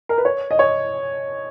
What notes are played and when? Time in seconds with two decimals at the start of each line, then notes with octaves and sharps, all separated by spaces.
0.09 A#4
0.18 B4
0.25 C#5
0.51 D#5
0.59 C#5